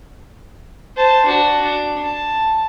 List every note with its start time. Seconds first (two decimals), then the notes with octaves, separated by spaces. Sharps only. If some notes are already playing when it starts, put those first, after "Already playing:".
0.97 C5 A5
1.26 D4 F#4
1.63 D4
2.03 A5